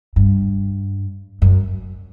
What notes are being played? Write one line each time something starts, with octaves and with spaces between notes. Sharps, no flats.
G2
F#2